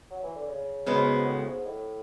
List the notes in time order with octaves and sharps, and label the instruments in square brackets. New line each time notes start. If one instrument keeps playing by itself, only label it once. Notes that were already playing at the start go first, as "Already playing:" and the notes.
[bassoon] F#3
E3
D3
C#3
[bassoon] G#2 [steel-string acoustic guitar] C#3 G#3 B3 F#4
[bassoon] G#2
G#2
A2
A2
G#2
A2